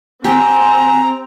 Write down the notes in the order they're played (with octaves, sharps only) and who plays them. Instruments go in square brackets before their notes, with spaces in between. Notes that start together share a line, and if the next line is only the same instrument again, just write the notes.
[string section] C4 [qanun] G4 [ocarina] G#5 [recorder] A#5